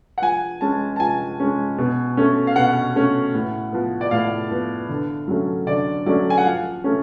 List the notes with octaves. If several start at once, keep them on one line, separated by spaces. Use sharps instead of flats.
F#5
F3 G#5
G#3 C#4 A5
A5
F3 G#5
G#3 C#4
B2
A3 C#4
F5
B2 F#5
A3 C#4
A2
F3 B3
D5
A2 F5
F3 B3
D3
F#3 A3 C#4
D3 D5
F#3 A3 C#4 D5
G#5
F#5
F3 F5
A3 C#4